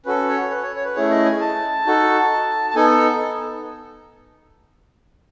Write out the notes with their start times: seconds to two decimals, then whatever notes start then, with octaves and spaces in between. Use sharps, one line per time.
0.06 C#4 F#4 A4 B4
0.29 C#5
0.50 B4
0.63 C#5
0.76 C#5
0.85 B4
0.96 A3 C#4 E4 G#4 C#5
1.11 D#5
1.26 G#5
1.40 A5
1.86 D#4 F#4 A4
2.70 A5
2.75 B3 D#4 A4 G#5